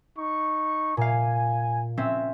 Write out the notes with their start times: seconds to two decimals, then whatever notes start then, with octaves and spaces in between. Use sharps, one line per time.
0.19 D#4 C#6
0.97 A#2 F5 G#5
1.97 C4 C#4 E5